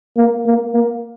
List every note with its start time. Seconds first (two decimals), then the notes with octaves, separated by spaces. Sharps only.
0.17 A#3
0.46 A#3
0.73 A#3